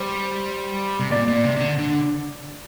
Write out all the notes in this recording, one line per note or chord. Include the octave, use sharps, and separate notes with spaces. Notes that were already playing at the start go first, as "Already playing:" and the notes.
Already playing: G3 C5
C3
A#2 D5
A#2
C3
C3
D3
D3